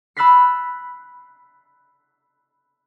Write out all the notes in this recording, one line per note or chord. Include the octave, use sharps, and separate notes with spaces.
B5 E6 F#6 A6 B6 C7